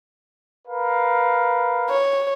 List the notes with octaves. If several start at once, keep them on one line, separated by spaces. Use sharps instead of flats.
A#4 B4 F5
C#5